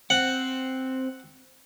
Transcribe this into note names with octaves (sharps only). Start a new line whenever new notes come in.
C4 F#5